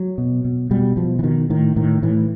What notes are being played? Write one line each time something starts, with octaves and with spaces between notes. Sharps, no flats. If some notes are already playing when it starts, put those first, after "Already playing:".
Already playing: F#3
B2
B2
B2 G3
B2 F3
E3
B2 D#3
A2 D#3
A2 D#3
A2 E3